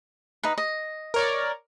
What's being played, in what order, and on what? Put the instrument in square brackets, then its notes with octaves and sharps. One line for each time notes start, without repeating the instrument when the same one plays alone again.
[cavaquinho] D#4 B4
D#5
[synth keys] A#4 C#5 D5